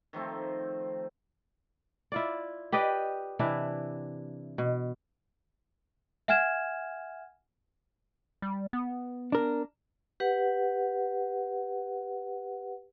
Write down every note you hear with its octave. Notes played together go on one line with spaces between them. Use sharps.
D#3 F3 A3 C4
E4 F4 D5
G4 B4 D5 D#5
C3 E3 D4 E4
B2
E5 F#5 G#5 F6 G#6 E7
G3
B3
D4 A#4
G4 B4 F#5